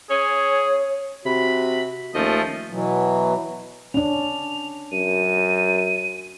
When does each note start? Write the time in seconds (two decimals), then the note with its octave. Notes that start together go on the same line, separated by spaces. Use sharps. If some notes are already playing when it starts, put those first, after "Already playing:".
0.10 C#4 G#4 C#5
1.25 C3 F#4 B5
2.14 D#2 F3 A3 C#4 D#5
2.70 B2 E3 F#3
3.94 C#4 D4 F7
4.92 F#2 D#7